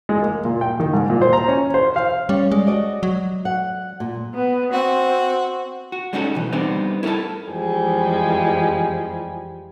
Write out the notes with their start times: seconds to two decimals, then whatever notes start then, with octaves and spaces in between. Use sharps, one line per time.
0.09 G#3
0.22 A#3
0.45 A#2
0.61 G5
0.80 D#3
0.94 G#2
1.10 A#2
1.21 C5
1.33 A#5
1.48 C#4
1.74 C5
1.96 F5
2.29 G3 C#4
2.52 G#3 D5
2.67 F#4 D5 D#5
3.03 F#3
3.45 F#5
4.00 A#2
4.35 B3
4.73 C4 F#4
5.92 F#4
6.13 G3 G#3 C#4 D#4 F#4 A4
6.35 B1 E3
6.52 G3 B3 C4 D4 D#4
7.03 E4 A4 A#4 E5 A5
7.50 F2 E3 F3 G3 G#3